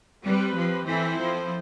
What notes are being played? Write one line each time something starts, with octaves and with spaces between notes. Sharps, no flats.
G3 C4 G4 B4
F3
E3 C4 E4 A4 C5
F3